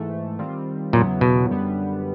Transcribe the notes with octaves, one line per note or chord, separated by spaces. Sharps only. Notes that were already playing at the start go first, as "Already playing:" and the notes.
Already playing: G#2 E3 A3
D#3 G3 C4 F4
E2 A#2 C#3 F#3 B3 E4
B2
F#2 D3 G3 B3